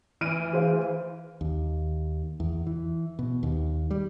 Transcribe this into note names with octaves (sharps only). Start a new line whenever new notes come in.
E3 F6 D7 D#7
G#4 C5 F5
D#2
E2
E3
B2
D#2
G3